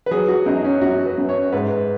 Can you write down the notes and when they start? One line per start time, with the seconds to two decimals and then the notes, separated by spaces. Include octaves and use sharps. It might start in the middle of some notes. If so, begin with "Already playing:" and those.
0.06 B4
0.11 F#3 G#4
0.28 F#4
0.46 F#2 D#4
0.64 C#4
0.81 F#2 F#4
1.06 B4
1.18 F#2
1.29 C#5
1.52 G#2 B4